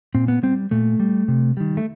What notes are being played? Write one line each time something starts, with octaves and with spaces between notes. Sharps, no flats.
A#2 C4
B3
G3 C4
A#2 A3
G3
C3
D#3 G3
A3